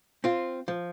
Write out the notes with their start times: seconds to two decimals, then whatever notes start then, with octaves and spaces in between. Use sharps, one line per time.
0.24 C4 F4
0.68 F3